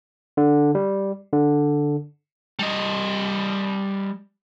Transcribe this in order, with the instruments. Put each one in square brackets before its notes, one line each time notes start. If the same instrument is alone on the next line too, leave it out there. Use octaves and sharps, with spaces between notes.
[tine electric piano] D3
G3
D3
[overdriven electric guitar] G3 D#5